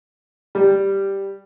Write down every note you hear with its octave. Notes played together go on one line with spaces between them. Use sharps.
G3